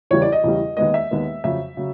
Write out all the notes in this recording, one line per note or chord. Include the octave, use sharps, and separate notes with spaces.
E2 C#3 E3 G3 C#5
D5
D#5
E2 C#3 E3 G3
D#2 D#3 G#3 B3 D#5
E5
D#2 D#3 G#3 B3
F2 C#3 F#3 E5
C#3 F#3